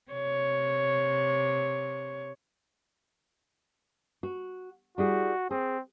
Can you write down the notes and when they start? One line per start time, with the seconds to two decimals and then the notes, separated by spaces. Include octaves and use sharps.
0.12 C3 C#5
4.23 F#4
4.98 G3 E4 F#4 G#4
5.51 C4 G#4